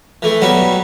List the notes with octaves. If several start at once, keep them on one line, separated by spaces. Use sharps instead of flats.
E3 A3
F#3 G3 B3 F#4